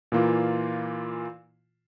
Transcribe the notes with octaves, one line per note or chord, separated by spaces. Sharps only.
A#2 E3 A#3 F4